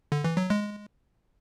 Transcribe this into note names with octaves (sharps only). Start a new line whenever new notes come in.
D3
E3
F#3
G#3